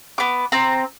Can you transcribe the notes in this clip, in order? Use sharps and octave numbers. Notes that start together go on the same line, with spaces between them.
B3 D6
C4 A#5